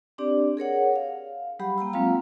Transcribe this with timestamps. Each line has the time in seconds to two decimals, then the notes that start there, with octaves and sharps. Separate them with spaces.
0.18 C4 D4 G4 D5
0.57 G#4 A#4 C#5 F#5
0.96 F5
1.59 F#3 G3 G4 F#5 B5
1.78 A#3 G5 A#5 E6
1.93 F#3 G#3 C4 F4 F5 A#5